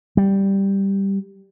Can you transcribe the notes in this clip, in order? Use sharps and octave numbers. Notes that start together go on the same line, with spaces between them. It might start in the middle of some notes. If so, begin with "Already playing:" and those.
G3